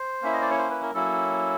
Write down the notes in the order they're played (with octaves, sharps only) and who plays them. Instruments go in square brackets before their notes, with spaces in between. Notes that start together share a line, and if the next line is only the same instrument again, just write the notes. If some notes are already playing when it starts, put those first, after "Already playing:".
Already playing: [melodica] C5
A#3 C#4 E4 E5
D#5
D5
C#5
C5
B4
A#4
F#3 A#3 C#4 E4 A4